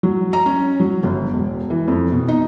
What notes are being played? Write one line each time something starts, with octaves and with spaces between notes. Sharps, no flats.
F#3
A#5
C#4
F#3
G1
E1
E3
F2
B2
D#4